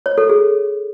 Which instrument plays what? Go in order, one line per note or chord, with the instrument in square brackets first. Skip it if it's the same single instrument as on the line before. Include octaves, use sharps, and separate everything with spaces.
[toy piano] C#5
A4
G#4